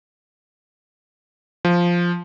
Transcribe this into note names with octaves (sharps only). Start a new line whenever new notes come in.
F3